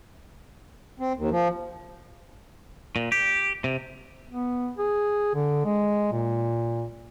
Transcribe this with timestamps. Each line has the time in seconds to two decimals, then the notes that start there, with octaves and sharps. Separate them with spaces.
1.00 C4
1.16 D#2
1.31 F3
2.96 A#2
3.12 G4
3.64 C3
4.29 B3
4.77 G#4
5.35 D3
5.65 G#3
6.12 A#2